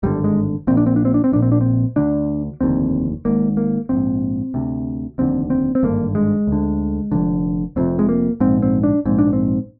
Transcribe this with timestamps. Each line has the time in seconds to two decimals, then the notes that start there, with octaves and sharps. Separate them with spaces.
0.03 G#1 G2 D3 G3
0.24 G#3
0.67 A#1 A#2 C4
0.77 D4
0.86 C4
0.96 D4
1.05 C4
1.14 D4
1.24 C4
1.33 A#1 A#2 D4
1.43 C4
1.52 D4
1.61 C4
1.96 D2 D3 D4
2.61 F1 D#2 D3 C4
3.25 G#1 G#2 A#3
3.57 A#3
3.89 A#1 G#2 C4
4.54 D2 C3
5.18 F1 D#2 D3 C4
5.50 C4
5.75 C4
5.83 G#1 G2 D3 A#3
6.15 G#3
6.47 D2 D3
7.12 F1 F2 D3
7.76 F1 F2 C3 C4
7.99 G#3
8.09 A#3
8.40 A#1 G#2 C4
8.62 C4
8.83 D4
9.06 A#1 G#2 C4
9.19 D4
9.33 C4